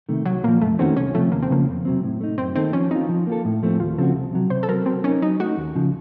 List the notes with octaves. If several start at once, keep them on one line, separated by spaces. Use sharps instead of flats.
C3 D#3 A3
C2 F#3
A#2 F3 A#3
F2 A3
D#3 A3 C4 C#4 F#4
C2 C#4
C3 F3 A3
D#2 A#3
C4
C#3 F3 A#3
F2
C3 F#3 C4
A2
A3 D#4
F#2 C4
D#3 A#3 C4 D#4 A4
F3 C#4
C4 D#4 F4
F3
A#3 F4 A4
A2
F3 A3 C4
D#2 F4
C#3 F3 C4 F#4 A4
C2
C3 F#3
C3 C5
A4
F#3 C4 A#4
F#3 C4
C4 C#4 D#4 A#4
F#3 D#4
A3 D#4 F#4
D#2
C#3 F3